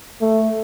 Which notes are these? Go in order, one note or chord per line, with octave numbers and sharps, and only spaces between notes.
A3